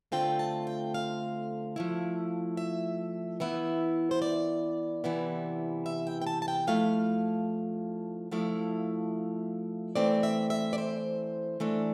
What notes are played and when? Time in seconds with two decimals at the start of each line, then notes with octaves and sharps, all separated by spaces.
0.12 D3 A3 C4 F4 G5
0.39 A5
0.67 G5
0.94 F5
1.76 F3 A3 E4
2.57 E5
3.40 E3 B3 E4
4.11 C5
4.22 D5
5.04 C3 E3 B3 E4
5.86 E5
6.07 G5
6.22 G5
6.27 A5
6.42 A5
6.48 G5
6.67 F3 A3 E4 F5
8.31 F3 A3 E4 F5
9.95 E3 A3 C4 D5
10.23 E5
10.50 E5
10.73 D5
10.78 C5
11.60 E3 A3 D4